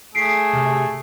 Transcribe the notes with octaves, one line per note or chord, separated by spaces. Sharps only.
A3 G#4 B6 C7 D7
C3